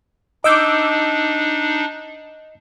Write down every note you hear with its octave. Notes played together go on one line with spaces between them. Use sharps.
D4 D#4 D#5 D6 E6 G6